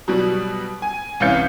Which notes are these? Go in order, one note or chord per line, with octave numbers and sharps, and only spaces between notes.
B2 F#3 G3
G#5
C2 E3 C#4 F5 G6 C#7